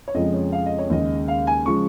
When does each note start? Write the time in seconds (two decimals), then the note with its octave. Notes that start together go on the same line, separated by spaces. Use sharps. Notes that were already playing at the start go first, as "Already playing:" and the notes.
0.08 C#5
0.14 F2 C#3 F3 G#3 D#5
0.34 C#5
0.52 F5
0.66 D#5
0.79 C#5
0.90 D#2 C#3 G#3 D#5
1.28 F5
1.47 G#5
1.66 C#3 F3 G#3 C#6